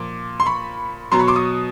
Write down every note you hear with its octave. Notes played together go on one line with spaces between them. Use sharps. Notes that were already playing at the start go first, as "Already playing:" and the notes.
Already playing: A#2 F3 D6
C6
B5 C#6
B2 F#3 A#5 C6
B5 C#6
C6 D6
C#6 D#6